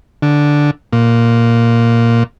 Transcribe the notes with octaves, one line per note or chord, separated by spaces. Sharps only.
D3
A#2